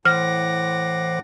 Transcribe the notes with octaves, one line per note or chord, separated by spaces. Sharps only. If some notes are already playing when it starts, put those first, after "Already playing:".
A2 E3 C5 F#5 D6 F6 A#6